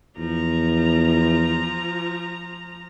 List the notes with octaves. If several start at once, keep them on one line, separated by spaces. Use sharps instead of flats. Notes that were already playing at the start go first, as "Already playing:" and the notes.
E2 F3 A#5